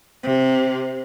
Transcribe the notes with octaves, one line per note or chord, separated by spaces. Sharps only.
C3